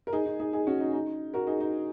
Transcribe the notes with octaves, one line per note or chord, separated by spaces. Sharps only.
A#4
D#4 G#4
D#4
D#4 G#4
D#4 G#4
C#4 F#4
D#4
D#4
F#4 A#4
D#4 G#4
D#4